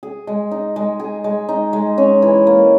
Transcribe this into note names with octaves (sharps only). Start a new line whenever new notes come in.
G#4
G#3
D#4
G#3
G#4
G#3
D#4
G#3
C#4
E3
A#3